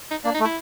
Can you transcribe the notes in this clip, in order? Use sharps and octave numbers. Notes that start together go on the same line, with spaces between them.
D#4
A#3 D4
D#4
A3
E4